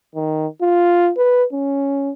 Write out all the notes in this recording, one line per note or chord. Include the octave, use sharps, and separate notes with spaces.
D#3
F4
B4
C#4